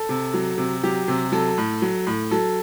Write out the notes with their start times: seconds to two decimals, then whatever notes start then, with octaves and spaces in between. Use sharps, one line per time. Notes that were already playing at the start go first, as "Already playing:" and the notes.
Already playing: A4
0.09 C3
0.34 F#3
0.58 C3
0.83 F#3 G4
1.08 C3
1.32 F#3 A4
1.58 A2
1.82 F#3
2.07 A2
2.31 F#3 A4